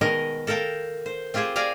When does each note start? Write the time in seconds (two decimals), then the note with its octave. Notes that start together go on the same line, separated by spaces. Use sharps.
0.01 B2 D#3 G#3 A#4 D#5
0.47 A4 A#4 F5 G5 A5
1.06 C5
1.34 C4 F4 G4 G#4 C5
1.56 G#4 D5 F5 A#5